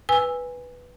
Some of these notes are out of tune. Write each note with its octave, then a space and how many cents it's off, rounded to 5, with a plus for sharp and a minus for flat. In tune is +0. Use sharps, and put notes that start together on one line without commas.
B4 +0 G#5 -15 E6 +0